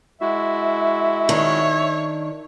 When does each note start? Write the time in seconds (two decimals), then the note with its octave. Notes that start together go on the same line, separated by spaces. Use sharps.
0.21 G#3 E4 F#4 E5
1.29 D#3 D4 C#5